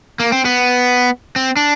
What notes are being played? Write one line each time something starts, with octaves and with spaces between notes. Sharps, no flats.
A#3
C4
B3
C4
D4